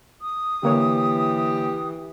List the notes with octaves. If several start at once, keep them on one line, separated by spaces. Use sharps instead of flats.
D#6
D3 E3 A#3 G4 C#5